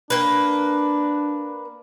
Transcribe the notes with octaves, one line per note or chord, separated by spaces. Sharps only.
A#3 D4 B4